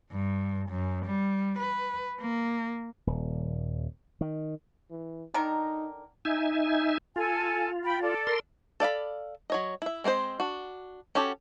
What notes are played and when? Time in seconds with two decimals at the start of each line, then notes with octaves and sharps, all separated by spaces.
0.12 G2
0.69 F#2
1.05 G3
1.58 B4
2.20 A#3
3.07 D#1
4.21 D#3
4.91 E3
5.34 D3 D#3 D#4 A#4
6.25 D#4 E5 G#5
7.16 F4 A4 G#5
7.84 G5 B5
8.02 A4 D5
8.27 A#4 C6
8.80 A4 D5 F5 B5
9.50 F#3 C#5 D#5
9.82 E4 E5
10.04 G#3 C4 F#4 C5 D#5
10.40 D4 F#4
11.15 C#4 F#4 G4 A4